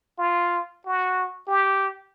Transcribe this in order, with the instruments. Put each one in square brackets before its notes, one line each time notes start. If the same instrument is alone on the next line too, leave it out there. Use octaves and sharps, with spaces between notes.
[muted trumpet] F4
F#4
G4